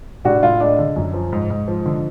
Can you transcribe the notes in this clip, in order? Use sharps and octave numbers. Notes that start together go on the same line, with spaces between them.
A2 D4 F#4
A2 F4
G#3 D4
D3
F#2
F3
G#2
G#2
F3
D3